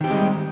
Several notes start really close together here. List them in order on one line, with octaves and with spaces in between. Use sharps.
D#3 G4 C4 G#3 G3